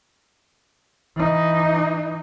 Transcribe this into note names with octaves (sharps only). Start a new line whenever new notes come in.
E3 D#4